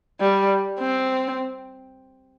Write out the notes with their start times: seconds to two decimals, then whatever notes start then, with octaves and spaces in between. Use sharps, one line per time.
0.20 G3
0.79 C4